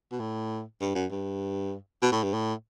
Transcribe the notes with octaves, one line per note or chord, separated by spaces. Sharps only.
B2
A2
G2
F#2
G2
B2
A2
G2
A2